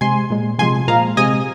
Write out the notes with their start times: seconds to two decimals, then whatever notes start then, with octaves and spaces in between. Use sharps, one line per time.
0.01 C3 G#3 G#5 C6
0.30 A#2 G#3
0.59 C3 F3 G#3 G#5 C6
0.88 A#2 F3 G#3 F5 A#5
1.17 C3 G#3 D#5 G#5